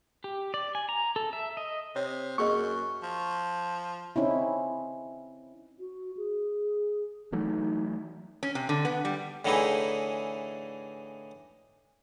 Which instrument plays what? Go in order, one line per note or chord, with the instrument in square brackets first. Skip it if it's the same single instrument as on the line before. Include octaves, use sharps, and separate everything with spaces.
[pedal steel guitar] G4
D5
G#5
A#5
A4
E5
D#5
[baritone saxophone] C3 [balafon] C#5
[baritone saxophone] F#2 [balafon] A#3 G#4 D#5 [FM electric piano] C#6
[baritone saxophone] F3
[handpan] C4 C#4 D#4 E4
[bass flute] F#4
G#4
[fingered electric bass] E3 F#3 A3 [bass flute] D#4
[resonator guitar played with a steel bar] C#4
C3
D3
B3
G3
[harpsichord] A2 D3 E3 D#4 E4 G#4